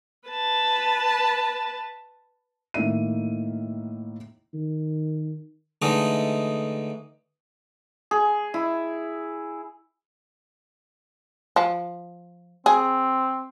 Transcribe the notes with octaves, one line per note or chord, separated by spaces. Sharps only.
B4 A5
A2 D#3 A#3 E5 D#7
D#3
D3 E3 G#3 A3 D#4
G#4
E4
F3
C4 G#4